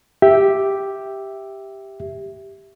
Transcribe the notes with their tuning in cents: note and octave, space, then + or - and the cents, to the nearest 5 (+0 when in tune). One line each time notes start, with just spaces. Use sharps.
G4 +0 E5 +0